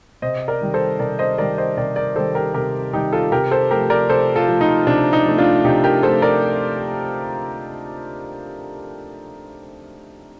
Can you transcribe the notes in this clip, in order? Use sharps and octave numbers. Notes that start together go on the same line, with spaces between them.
C3 C5 D#5
A#4 D5
D#3 G3
A4 C5
C3 A#4 D5
C5 D#5
D#3 G3 A#4 D5
C5 D#5
C3 A#4 D5
A#4 D5
D#3 G3 A4 C5
G4 A#4
C3 G4 A#4
D#3 G3 D#4 G4
F4 A4
C3 G4 A#4
A4 C5
F3 A3 G4 A#4
A#4 D5
C3 A4 C5
F4 A4
F3 A3
D#4
C3 D4
D#4
F3 A3
D4 F4
C3 D#4 G4
G4 A#4
F3 A3 A4 C5
A#4 D5